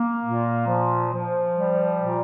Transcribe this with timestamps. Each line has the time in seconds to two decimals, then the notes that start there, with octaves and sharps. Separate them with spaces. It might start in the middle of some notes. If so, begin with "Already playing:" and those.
Already playing: A#3
0.23 A#2
0.67 F3
1.12 F3
1.55 G3
2.01 A#2